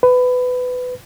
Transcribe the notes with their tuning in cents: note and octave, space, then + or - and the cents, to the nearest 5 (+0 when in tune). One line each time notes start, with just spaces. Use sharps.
B4 +20